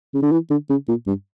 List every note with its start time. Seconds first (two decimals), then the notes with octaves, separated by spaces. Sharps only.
0.14 C#3
0.22 D3
0.32 E3
0.50 D3
0.70 C#3
0.88 A#2
1.07 G2